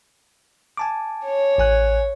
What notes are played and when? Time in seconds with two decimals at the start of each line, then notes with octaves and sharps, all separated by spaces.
0.77 G#5 A5 D6
1.25 C#5
1.58 A1 G#5 F#6